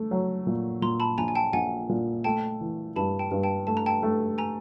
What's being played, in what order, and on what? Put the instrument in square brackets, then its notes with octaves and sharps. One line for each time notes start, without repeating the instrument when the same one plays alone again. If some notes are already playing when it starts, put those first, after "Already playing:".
Already playing: [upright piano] A3
F#3
A#2
[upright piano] A#2 [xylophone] A#5 C6
[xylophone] A5 B5
[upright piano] A#1 [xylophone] G#5 A#5
[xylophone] G#5
G5 A5
[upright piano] A#1 [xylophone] F#5 G#5
[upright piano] A#2
[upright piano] A3 [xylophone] G5 A5
[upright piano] E3
[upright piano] G2 [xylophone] A5 B5
[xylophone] G5 A5
[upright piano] G2
[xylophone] G5 A5
[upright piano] A3 [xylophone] A5
[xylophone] A#5
G5 A5
[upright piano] A3
[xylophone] G#5 A#5